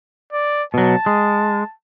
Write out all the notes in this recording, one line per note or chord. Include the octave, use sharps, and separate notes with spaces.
D5
B2 F#3 A5
G#3